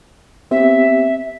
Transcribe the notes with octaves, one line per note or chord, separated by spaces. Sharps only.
B3 C4 G4 E5